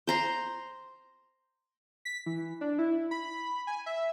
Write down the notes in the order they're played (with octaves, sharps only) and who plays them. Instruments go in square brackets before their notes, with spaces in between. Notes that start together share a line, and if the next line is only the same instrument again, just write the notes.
[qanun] C5 A#5 C6
[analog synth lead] B6
E3
D4
E4
B5
G#5
E5